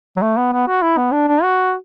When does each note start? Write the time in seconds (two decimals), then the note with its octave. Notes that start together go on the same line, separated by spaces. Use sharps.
0.17 F#3
0.22 A3
0.37 B3
0.53 B3
0.68 F#4
0.82 E4
0.97 B3
1.12 D4
1.28 D4
1.43 F#4